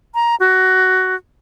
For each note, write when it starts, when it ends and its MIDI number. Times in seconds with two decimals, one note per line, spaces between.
0.15 0.35 82
0.40 1.15 66